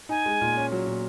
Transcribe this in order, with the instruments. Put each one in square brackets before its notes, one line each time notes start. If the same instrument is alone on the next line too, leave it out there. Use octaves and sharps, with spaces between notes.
[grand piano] D#4 [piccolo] G#5
[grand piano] G#3
A#2
C#4
F#3
A#2